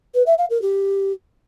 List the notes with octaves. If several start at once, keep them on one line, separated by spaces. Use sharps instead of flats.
B4
E5
F5
A#4
G4